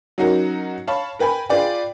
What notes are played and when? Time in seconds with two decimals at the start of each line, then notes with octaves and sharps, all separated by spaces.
0.18 F#3 C#4 D#4 F#4 A#4
0.87 C#5 F5 A5 B5 C#6
1.19 A#4 B4 G5 G#5 B5
1.49 F4 G#4 B4 D5 G5